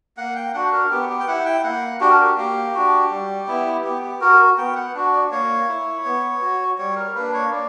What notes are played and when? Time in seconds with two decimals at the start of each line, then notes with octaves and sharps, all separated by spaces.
0.17 A#3 F#5
0.35 G5
0.54 D4 F#4 F#5
0.72 A#4
0.91 B3 G4
1.09 G4
1.20 G5
1.28 E4 F#5
1.45 G5
1.64 A#3 F#5
2.00 D4 F#4 G4
2.10 A#4
2.20 G4
2.37 A#3 G4
2.74 D4 F#4
3.11 G3
3.47 B3 E4
3.84 B3 G4
4.02 G4
4.21 F#4 A#4
4.58 B3 G5
4.76 F#5
4.95 D4 F#4
5.13 D5
5.31 A#3 C#5
5.68 E4
6.05 B3
6.42 F#4
6.78 G3 C#5
6.96 A#4
7.15 A#3 D4 B4
7.34 C#5
7.52 A#3 D5